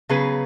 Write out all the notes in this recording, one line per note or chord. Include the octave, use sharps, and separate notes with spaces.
C#3 F#3 B3 G#4 B4